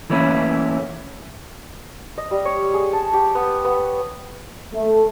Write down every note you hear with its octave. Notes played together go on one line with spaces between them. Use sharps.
E3 A3 A#3 C#4 E4
D#5
G3
C#5
G#4
A5
G4
B3
B3
A3